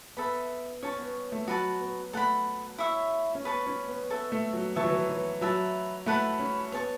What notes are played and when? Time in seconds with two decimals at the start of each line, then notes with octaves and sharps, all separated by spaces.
0.17 B3 A4 E5 B5
0.83 C#4 C#5 A5 C#6
0.98 B3
1.32 A3
1.48 F#3 F#4 B4 A5
1.81 B3
2.13 A3 A4 F#5 B5
2.78 E4 C#5 E5 C#6
3.35 C#4
3.45 B3 B4 A5 C#6
3.66 C#4
3.88 B3
4.10 B3 A4 E5 C#6
4.32 A3
4.53 F#3
4.75 E3 C#5 E5 A5 C#6
4.84 F#3
4.91 E3
5.09 E3
5.41 F#3 B4 E5 A5
6.06 A3 E4 B4 F#5 A5
6.39 C#4
6.72 B3 C#5 A5 C#6